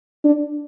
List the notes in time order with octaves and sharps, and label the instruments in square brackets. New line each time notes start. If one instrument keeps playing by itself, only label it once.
[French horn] D4